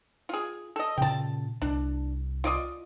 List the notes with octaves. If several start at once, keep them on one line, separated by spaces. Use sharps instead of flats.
F4 G#4
A4 D#5
A#2 C#3 G5 A5
C2 D4
F4 D5 D#5